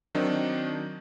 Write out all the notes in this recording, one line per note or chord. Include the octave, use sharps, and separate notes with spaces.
D#3 F#3 C4 D4 D#4